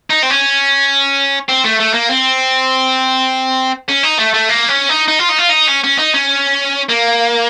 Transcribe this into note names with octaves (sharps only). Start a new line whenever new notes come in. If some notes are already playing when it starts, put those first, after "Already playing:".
D#4
C4
C#4
C4
A3
A3
A#3
C4
C#4
D#4
A3
A3
A#3
C#4
D#4
D#4
F4
D#4
F4
D#4
C#4
C#4
D#4
C#4
A#3